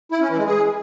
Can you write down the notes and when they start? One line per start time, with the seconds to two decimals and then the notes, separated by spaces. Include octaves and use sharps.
0.12 E4
0.21 C#4
0.29 E3
0.38 G#3
0.47 G#4